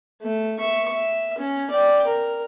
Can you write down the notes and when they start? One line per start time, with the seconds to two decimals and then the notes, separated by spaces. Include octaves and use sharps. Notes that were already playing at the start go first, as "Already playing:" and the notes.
0.22 A3
0.59 E5 C#6
0.93 E5
1.38 C#4
1.70 D5 G5
2.07 A#4